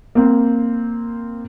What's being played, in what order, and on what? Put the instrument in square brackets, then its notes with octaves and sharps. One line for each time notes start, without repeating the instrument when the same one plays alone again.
[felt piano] A#3 C4